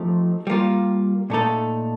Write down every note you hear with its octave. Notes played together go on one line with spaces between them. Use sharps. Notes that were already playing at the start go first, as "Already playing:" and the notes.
Already playing: F3 A3 C4 D#4 G4
G3 A#3 F4
A#2 A3 D#4 A4